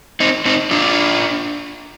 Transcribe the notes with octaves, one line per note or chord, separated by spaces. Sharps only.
C4 D#4
C4 D#4
D4 F4